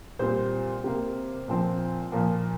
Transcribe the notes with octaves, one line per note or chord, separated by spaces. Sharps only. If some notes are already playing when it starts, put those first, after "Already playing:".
A#2 G3 C4 C5
C3 A#3
A#2 F3 C4
A#2 F3 A#3